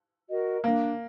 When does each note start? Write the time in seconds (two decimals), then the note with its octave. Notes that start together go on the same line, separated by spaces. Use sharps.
0.29 F#4 A#4 D#5
0.64 A#3 D4